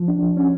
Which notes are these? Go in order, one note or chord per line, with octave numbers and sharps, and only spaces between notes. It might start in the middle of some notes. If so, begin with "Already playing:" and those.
Already playing: F3
D4
F3
C#4